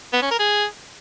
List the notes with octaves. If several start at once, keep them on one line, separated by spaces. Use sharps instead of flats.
B3
C#4
A#4
G#4